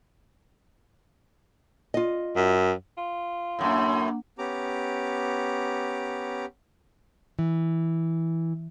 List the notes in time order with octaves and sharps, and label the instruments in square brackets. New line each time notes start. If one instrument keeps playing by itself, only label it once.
[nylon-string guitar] F4 D#5
[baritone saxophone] F#2
[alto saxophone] F4
[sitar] F#2 A2 [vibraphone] A#3 D4 F#5 [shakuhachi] C6
[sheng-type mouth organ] B3 C#4 G4 A#5 D6
[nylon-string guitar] E3